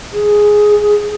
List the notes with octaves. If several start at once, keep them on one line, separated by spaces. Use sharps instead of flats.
G#4